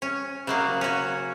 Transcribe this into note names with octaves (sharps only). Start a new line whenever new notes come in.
C#4
C#3 F#3 A#3
C#4 F#4